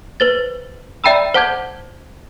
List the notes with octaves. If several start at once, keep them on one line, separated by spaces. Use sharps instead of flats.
B4 C5 A6
D5 E5 G5 A#5 B5 E6
C5 F#5 A5 D6 G6 G#6